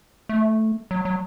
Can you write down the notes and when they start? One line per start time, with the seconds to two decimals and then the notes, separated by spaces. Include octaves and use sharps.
0.29 A3
0.91 F#3
1.05 F#3